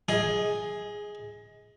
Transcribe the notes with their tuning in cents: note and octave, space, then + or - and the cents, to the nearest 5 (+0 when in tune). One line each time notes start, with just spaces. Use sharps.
G#4 +0 D#5 +25